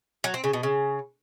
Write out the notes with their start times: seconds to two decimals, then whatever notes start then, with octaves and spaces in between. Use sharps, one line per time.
0.24 F#3
0.34 C4
0.44 C#3
0.53 B2
0.63 C#3